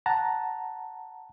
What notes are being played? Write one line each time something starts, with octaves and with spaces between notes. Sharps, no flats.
F#5 A5 A#5